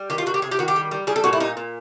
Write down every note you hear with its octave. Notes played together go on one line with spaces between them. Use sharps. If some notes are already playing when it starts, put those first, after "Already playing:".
Already playing: G3
D#3 G4
F4
D#3 F#4
G4
C3 G#4
G4
D#3 F#4
G4
G3
G3
G3 G#4
A4
A#2 F#4
E4
A#2 D#4
A#2